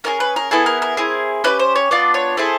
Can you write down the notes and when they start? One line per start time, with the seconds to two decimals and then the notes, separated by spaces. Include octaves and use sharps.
0.04 C#4 F4 G#4 A#4
0.20 B4
0.36 A#4
0.51 B3 E4 G#4 A4
0.66 A#4
0.82 A#4
0.97 C4 E4 G#4
1.44 C#4 E4 G4 B4
1.59 C5
1.76 C#5
1.91 B3 D4 F4 D5
2.14 C#5
2.37 C4 E4 G#4 A4